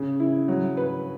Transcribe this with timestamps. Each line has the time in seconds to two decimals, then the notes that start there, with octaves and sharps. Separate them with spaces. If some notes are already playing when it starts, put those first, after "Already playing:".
Already playing: C#3
0.20 E4
0.48 F#3
0.77 B4